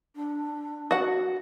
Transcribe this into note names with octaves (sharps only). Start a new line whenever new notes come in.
D4
F#4 F#5